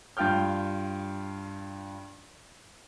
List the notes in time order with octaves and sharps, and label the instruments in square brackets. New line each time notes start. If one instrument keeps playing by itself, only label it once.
[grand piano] G2 F4 G5 F6 G6